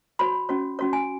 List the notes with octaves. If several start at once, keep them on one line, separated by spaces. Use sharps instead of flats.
F#4 C#5 B5
C#4 F#4 C#5
C#4 F#4 C#5
G#5